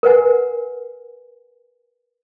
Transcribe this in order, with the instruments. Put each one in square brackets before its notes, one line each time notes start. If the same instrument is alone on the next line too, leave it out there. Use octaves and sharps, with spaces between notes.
[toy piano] A#4 B4 F#5 G#5